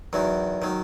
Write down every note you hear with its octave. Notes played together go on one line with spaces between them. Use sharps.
E2 D#3 F#3
D#3 F#3